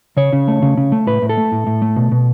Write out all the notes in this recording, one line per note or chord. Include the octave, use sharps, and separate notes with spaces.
C#3 C#5
C#3
A3
C#3
C#3
A3
A2 B4
A2
A4
A3
A2
A2
A3
B2
B2